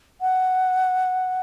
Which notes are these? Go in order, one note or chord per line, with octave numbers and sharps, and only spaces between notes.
F#5